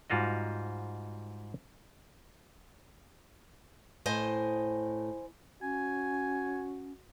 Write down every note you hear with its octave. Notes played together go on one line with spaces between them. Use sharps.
G#2 G3 F4 F#4 D#5
A2 C5 D#5 G#5
C#4 F#4 G#5